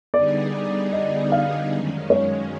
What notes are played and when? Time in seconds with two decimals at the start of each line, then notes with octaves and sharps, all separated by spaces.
0.13 D3 G3 B3 D#4 G#4 D5
0.92 D#5
1.32 F5
1.71 F#2 D#3 G#3 C#4
2.10 C#5